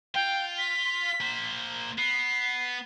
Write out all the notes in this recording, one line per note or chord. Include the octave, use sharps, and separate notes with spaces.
F4 G5
B6
A#3 C5
B3 C7